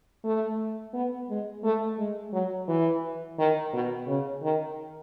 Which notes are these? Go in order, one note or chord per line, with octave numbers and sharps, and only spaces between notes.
A3
B3
G#3
A3
G#3
F#3
E3
D#3
B2
C#3
D#3